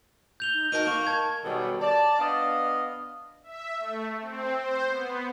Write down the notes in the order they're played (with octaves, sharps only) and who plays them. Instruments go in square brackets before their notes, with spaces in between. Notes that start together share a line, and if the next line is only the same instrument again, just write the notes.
[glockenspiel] G6 F7 G7
[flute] D#4
[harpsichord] D#4 A#4 A5 [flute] F#4
[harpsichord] A#3 [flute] C#6
[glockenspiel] A5 G#6
[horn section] B2 D#3 F#3 G3 G#4 A4
D5 A5
B3 D4 D#5 F5
[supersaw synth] E5
A3
C4
C5
B3